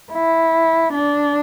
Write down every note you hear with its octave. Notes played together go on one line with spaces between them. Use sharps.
E4
D4